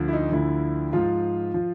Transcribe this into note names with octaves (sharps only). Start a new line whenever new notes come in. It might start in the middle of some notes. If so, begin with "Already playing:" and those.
Already playing: D2 D3 F3
E4
D#4
D2 D3 F3 E4
G#2 F3 F4
F3